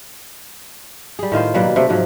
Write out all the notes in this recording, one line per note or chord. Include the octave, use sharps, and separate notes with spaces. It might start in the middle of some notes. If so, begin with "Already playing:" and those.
G3 G#4
A2 D#3 F4 C5
B2 F#3 G3 A#3
C3 A3
G#2 C3 F3 F#3